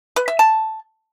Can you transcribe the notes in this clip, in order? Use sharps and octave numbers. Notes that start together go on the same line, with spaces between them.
B4
E5
A5